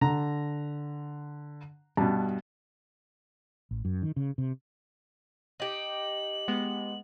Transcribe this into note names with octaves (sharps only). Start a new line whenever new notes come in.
D3 A#5
G2 B2 A5
A1
F#2
D#3
C#3
C3
D#4 G4 F#7
G#3 B3